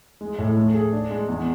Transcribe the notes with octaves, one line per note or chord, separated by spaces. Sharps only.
G#3
A2
A3
G#4
D4
G#3
E2